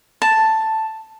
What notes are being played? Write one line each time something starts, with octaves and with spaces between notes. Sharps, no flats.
A5